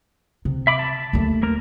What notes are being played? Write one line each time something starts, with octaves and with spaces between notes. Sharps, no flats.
C3
E5 B5 D6
A5
D#2 A3
A#3 A#4